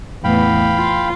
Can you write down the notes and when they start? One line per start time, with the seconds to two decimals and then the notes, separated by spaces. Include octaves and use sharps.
0.24 E2 A2 B3 F5 G5 B5
0.76 F4